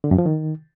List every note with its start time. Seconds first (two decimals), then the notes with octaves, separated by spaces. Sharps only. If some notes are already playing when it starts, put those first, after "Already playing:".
0.04 D3
0.11 F#2
0.18 F3
0.26 D#3